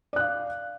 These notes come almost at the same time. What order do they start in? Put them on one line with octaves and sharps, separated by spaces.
D5 F#6 F5